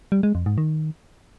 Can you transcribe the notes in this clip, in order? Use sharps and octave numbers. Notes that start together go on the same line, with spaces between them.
G3
G#3
F2
G#2
D#3